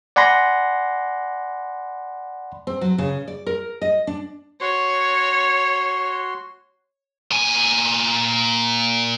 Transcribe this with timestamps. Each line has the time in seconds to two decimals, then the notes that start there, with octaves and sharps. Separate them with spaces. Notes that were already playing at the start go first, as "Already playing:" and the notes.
0.16 D5 F#5 G#5 B5 C6 A#6
2.67 C4
2.81 F#3
2.98 C#3
3.28 D5
3.47 A#4
3.82 D#5
4.07 D4
4.61 F#4 C#5 C6
7.31 A#2 G#5